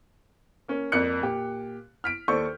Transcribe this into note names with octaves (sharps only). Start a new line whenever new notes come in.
A#3 C#4
F2 A#3 D5 F#6 C#7
A#2 G4
F6 B6 D7
D#2 A4 C5 D5 C#6 G6